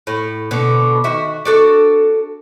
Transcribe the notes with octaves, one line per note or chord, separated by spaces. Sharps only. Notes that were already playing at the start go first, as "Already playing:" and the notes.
A2
B2 D3
D#3 F#4 E5
D4 F#4 A4